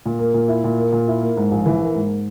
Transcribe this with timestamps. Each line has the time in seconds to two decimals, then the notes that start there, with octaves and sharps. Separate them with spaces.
0.06 A#2
0.19 A#3
0.34 A#2
0.48 E4
0.64 A#2
0.79 A#3
0.92 A#2
1.08 E4
1.21 A#3
1.37 G#2
1.51 A#1
1.66 E3
1.81 A#3
1.95 G#2